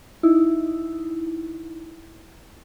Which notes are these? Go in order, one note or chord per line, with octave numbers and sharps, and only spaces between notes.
D#4 E4